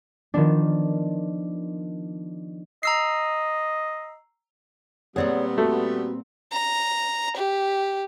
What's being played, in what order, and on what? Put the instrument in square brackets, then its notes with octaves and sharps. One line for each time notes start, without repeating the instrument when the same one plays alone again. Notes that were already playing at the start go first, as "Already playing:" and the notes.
[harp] D#3 F3 B3 D4
[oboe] D#5 [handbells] A#5 E6 C7
[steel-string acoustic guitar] A#2 C4 F#5 [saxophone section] G3 B3 [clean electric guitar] G#4 C#5 D5
[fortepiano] A3 [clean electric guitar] F#4
[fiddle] A#5
G4